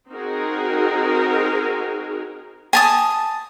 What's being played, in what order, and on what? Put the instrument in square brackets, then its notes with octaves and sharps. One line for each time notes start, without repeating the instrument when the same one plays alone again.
[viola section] C4 D#4 F#4 G#4 A#4
[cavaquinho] G#5 A5 D#6